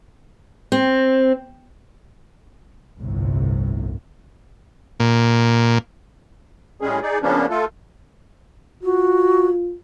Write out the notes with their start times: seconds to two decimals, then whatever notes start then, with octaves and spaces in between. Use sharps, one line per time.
0.72 C4
2.99 G1 C2 A2 C3
5.00 A#2
6.81 A2 G3 G#3 C#4 G#4
7.02 D#4 G#4 D5
7.22 C#3 F3 A#3 B3 C#4 D4
7.50 A3 F4 A4
8.83 F4 F#4